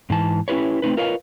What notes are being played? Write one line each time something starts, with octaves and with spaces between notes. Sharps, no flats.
G#2 E3 A5
C#4 E4 F4 G4 B4 C#5
A3 C4 D#4 B4
F4 A#4 B4 C#5 D#5 F5